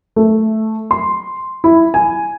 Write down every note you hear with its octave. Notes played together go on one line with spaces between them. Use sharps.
A3
C6
E4
G#5